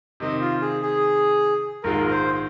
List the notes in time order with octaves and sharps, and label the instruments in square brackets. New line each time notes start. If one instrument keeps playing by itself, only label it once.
[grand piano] C3 D#3 C4 [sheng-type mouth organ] D#5
[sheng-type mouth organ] F4
G#4
G#4
[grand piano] A#1 G#2 D#3 G#3 F4 [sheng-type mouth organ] A#4
[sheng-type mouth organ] A#4
C5